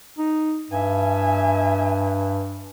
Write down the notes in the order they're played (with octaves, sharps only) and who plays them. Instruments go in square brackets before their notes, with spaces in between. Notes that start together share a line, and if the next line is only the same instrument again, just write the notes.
[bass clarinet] D#4
[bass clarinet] G2 [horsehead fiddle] E5 G#5